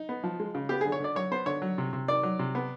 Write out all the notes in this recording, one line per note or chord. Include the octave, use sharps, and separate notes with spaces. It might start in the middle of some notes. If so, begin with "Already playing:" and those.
Already playing: D#4
B3
F3
G#3
C#3
B3 G4
D3 G#4
C#5
D3 D5
F#3 C#5
B3 C5
D3 C#5
F#3
C3
C3
D#3 D5
F#3
C3
B3